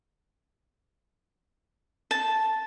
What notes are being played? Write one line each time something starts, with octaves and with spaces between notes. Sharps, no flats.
A5